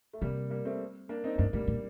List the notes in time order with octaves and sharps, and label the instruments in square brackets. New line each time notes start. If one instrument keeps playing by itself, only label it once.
[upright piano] A3
[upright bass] C3 [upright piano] G3 A#3
[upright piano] G3 A#3
A3 C4
A#3 D4
C4 D#4
[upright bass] G2 [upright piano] A#3 D4
[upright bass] A2 [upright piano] G3 A#3
[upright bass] A#2